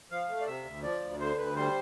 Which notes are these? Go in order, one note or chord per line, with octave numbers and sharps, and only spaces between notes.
F3 F5
A3
D5
C3 E5
D2
F3 D5
D2
D3 C5
D2 B4
G3 C5